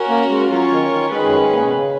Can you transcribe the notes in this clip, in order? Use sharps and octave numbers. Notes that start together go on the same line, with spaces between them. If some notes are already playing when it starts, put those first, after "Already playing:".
Already playing: C#4 F#4 A#4
A#3
G#3
F#3 C#4 F4 A#4 C#5
D#3
D#3
D#3 G#3 C#4 G#4 B4
F#2
G#2
A#2
B2
C#3